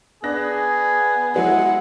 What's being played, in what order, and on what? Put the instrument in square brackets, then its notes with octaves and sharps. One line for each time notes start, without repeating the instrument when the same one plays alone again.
[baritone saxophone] B3 [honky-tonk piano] D4 F#6 A#6 [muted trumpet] G#4
[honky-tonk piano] F#3 G#3 [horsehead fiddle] E4 F#5